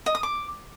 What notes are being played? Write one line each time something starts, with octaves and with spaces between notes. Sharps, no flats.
D#5
D#6
D6